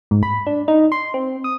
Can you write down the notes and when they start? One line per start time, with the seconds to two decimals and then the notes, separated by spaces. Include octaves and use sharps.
0.11 G#2
0.23 B5
0.47 D4
0.68 D#4
0.92 C6
1.14 C4
1.44 D#6